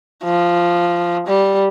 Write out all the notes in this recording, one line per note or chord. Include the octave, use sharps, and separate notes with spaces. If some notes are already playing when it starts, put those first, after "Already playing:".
F3
G3